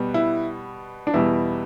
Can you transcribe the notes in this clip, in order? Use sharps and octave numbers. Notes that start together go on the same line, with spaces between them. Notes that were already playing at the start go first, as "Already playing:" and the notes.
Already playing: B2 G3 B3
E4
D4
E2 B2 G3 E4